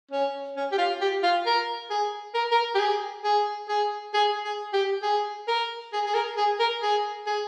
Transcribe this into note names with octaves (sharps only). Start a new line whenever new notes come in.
C#4
C#4
G4
F4
G4
F4
A#4
G#4
A#4
A#4
G4
G#4
G#4
G#4
G#4
G#4
G4
G#4
A#4
G#4
G#4
A#4
G#4
A#4
G#4
G#4